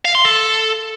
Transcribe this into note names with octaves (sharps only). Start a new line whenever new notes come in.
F5
C6
A4